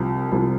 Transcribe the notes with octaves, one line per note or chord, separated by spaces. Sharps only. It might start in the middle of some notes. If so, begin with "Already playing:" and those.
Already playing: C2 C3 F3
C2 C3 F3